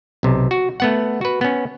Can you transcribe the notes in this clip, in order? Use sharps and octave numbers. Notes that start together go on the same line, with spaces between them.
B1 C3
F#4
A3 B3 F#5
F#4 B4
B3 C#4